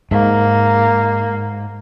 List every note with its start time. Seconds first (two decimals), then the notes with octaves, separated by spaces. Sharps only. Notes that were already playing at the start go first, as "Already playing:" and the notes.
0.11 G#2 A#3